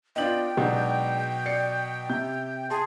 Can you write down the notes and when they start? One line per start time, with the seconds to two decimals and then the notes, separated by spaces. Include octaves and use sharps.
0.16 B3 D4 F4 D#5 G5 F#7
0.57 B2 F#3 G#3 D4 D#4
1.46 D5 C7 C#7
2.10 C3 G6
2.70 G#4 A5 C6